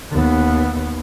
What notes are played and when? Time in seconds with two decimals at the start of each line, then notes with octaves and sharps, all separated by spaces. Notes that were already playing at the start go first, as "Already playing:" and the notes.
0.12 D#2 B3